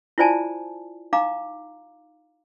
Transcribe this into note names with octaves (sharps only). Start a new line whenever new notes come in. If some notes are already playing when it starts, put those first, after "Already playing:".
E4 F4 C5 D5 G#5 A5
D#4 F5 A#5 D6